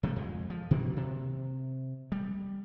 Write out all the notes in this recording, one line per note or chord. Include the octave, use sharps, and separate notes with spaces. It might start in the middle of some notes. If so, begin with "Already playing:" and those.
C3 F3 G#3 A3
F2 G#3
F3
B2 D#3 E3 A#3
C3
G3